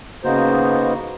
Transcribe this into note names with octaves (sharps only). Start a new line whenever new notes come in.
C#3 A#3 B3 D#4 F#4 C5